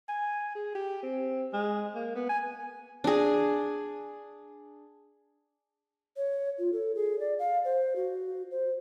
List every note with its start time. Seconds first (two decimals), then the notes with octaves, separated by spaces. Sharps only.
0.08 G#5
0.55 G#4
0.75 G4
1.03 C4
1.53 G#3
1.95 A#3
2.15 B3
2.29 G#5
3.04 D4 G#4
6.17 C#5
6.59 F4
6.73 A4
6.95 G#4
7.20 D5
7.39 F5
7.65 C5
7.96 F#4
8.51 C5